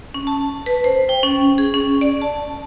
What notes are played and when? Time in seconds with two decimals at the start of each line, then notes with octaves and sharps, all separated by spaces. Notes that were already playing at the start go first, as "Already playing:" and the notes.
0.14 C#4
0.27 A5
0.66 B4
0.84 C5
1.09 G5
1.23 C#4
1.58 G#4
1.74 C#4
2.01 D5
2.22 A5